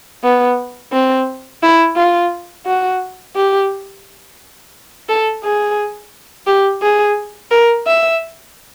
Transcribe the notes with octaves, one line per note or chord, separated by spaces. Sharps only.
B3
C4
E4
F4
F#4
G4
A4
G#4
G4
G#4
A#4
E5